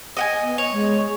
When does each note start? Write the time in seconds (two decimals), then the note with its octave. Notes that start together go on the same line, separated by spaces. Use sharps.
0.17 D#5 F#5 G#5
0.42 B3
0.58 C#5
0.72 G#3